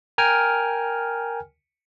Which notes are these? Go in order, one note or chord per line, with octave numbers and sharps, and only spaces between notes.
A#4 G5 G#5 F6